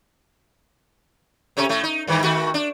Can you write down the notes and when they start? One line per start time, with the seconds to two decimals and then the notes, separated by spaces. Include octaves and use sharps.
1.57 C3 C#4 A4
1.69 A2 A3
1.84 D#4
2.07 G2 D#3 E3
2.23 D#3 A3 F#4
2.54 D4